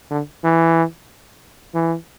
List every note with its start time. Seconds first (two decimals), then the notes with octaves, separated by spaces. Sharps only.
0.10 D3
0.44 E3
1.75 E3